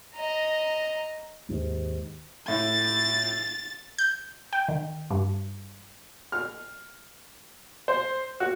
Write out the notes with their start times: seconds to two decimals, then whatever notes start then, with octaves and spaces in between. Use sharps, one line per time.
0.15 D#5 A#5
1.49 D#2 G#2
2.48 A2 E4 A6
3.98 G6
4.53 G5
4.68 D#3
5.10 G2
6.32 F6
7.88 C5
8.40 F#4